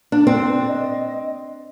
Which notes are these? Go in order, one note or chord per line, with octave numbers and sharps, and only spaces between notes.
D4
C4 D5
D#5